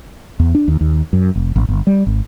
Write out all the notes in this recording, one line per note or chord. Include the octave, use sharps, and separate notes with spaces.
E2
D4
D#2
D#2
F#2
F1
A1
G1
G3
G#1